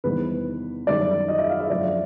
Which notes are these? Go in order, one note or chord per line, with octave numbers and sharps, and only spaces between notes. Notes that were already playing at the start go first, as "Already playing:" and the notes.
E2 C3 D#3 G3 C4 B4
F#2 D#3 G3 C4 D5
D#5
E5
F5
E5
F#2 D3 F3 D5